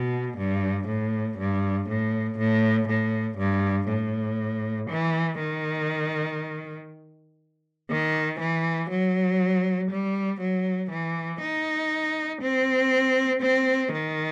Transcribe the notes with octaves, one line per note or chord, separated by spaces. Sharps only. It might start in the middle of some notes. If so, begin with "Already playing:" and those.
Already playing: B2
G2
A2
G2
A2
A2
A2
G2
A2
E3
D#3
D#3
E3
F#3
G3
F#3
E3
D#4
C4
C4
D#3